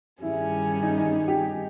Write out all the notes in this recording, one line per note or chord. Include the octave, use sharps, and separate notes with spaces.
G2 D#3 G3 C#4 E4 G#4
D#4
D#4
G4